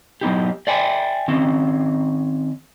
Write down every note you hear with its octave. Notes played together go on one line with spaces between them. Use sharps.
F#3 B3 D#4 G4
D5 E5 G5 G#5
D#3 C4 C#4